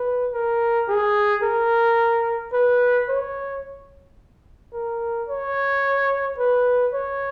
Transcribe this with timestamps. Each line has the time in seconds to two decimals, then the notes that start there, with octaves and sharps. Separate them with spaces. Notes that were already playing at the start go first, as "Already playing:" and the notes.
Already playing: B4
0.33 A#4
0.88 G#4
1.43 A#4
2.53 B4
3.09 C#5
4.74 A#4
5.28 C#5
6.38 B4
6.93 C#5